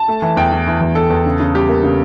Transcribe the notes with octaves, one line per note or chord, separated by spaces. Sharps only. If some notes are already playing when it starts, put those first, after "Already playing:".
Already playing: A5
A3
E3
E2 G5
E3
E3
E2
E2 A4
E2
C#3
C#3
G3 G4
A#3
C#3